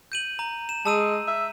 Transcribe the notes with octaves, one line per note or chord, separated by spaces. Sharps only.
G6 D#7 F#7
A#5
E7
G#3 A5 E6 D#7
E5